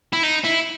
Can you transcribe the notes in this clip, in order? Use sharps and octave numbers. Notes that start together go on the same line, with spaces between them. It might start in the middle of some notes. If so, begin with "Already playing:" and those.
E4
D#4
E4